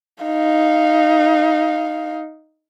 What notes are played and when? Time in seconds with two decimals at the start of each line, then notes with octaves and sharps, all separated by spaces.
0.24 D#4 F5